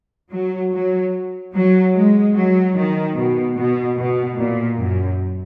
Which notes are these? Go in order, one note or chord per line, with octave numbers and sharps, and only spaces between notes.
F#3
F#3
F#3
G#3
F#3
D#3
B2
B2
B2
A#2
F#2